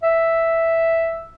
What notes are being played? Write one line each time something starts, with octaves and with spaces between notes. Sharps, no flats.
E5